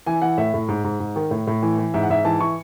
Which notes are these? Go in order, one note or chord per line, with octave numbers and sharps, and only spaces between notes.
E3 G#5
E3 F#5
A2 E5
A2
G#2
G#2
G#2
D#3
A2
A2
E3
E3
G#2 E5
F#5
G#2 E5
E3 A5
E3 C#6